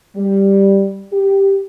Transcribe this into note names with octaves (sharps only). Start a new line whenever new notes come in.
G3
G4